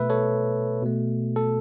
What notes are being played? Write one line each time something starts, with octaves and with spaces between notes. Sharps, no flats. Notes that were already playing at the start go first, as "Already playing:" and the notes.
Already playing: B2 A3 B4 E5
A4 C#5
B2 A3
A4